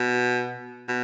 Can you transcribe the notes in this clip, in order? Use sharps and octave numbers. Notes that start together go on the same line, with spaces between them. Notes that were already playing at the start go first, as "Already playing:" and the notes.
Already playing: B2
B2